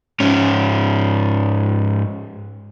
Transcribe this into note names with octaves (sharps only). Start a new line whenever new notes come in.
G#2 C#4